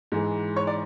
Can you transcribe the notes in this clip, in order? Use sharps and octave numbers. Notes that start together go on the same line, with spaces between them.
G#2 E3 G#3
C#5 C#6
D5 D6